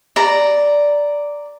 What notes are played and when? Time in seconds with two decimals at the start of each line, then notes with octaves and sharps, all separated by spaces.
0.16 D5 A#5